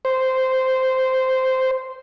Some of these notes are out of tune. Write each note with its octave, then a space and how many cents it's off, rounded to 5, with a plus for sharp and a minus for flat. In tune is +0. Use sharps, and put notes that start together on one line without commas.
C5 -10